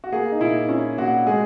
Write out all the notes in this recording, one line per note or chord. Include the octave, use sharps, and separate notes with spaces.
F#4
A#3 G#4
D#4
A#2 E4
C#4 E4
A#2 F#4
G#3 G#4